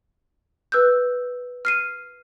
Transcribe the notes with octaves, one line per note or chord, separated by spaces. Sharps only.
B4 E6 F#6 G6
F6 C7 D#7